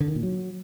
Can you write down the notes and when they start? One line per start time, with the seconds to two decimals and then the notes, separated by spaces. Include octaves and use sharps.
0.01 D3
0.08 D#3
0.16 A#2
0.23 F#3